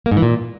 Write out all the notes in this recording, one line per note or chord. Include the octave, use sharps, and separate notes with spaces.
A#3
G#2
E3
A#2